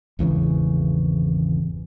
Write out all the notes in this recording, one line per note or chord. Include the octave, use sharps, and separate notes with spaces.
G#1 E2 C#3 E3